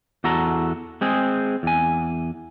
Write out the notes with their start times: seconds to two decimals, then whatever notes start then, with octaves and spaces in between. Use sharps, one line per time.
0.24 E2 F#4 A4 A#5
1.01 G#3 C4 G#4
1.63 E2 G#5